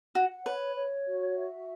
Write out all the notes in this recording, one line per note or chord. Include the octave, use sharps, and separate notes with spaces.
F#4 F#5
B4 C#5
C#5
F#4
E5